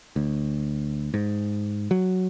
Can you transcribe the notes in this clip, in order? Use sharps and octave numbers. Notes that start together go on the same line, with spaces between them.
D2
G#2
F#3